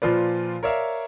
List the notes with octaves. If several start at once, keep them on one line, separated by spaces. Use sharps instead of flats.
A#2 F3 F4 B4 D5
A#4 C#5 D5 E5 F5